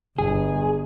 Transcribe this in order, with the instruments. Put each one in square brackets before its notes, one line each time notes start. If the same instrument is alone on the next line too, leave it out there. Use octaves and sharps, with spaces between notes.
[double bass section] G1 [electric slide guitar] G#4